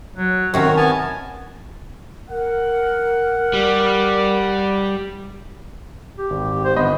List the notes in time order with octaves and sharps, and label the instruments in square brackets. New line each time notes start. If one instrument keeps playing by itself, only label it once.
[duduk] F#3
[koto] C3 D#3 C#4 [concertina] F#4 C#5 [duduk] A#4
[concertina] B3 G#5 A5
[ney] A#4 [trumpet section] F#5
[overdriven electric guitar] G3
[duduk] G4
[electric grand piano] G#1
[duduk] C5
[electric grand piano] G1 D#5 B5 [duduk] B3